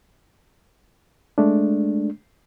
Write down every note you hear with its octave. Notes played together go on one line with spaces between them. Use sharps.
G#3 A3 D4